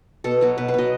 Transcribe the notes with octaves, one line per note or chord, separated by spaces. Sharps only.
B2 A4
F#3 B3
B2 B4
B4
F#3 B3 D#5